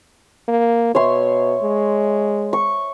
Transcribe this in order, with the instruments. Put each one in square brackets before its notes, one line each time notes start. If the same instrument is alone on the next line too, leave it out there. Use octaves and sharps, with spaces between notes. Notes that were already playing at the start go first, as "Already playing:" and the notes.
[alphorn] A#3
[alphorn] B2 [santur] C#5 E5 C6
[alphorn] G#3
[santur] C#6